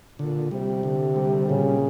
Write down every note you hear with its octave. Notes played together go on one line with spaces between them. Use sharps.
A#2 D3
C3 G3
D3
G3
A#2 C#3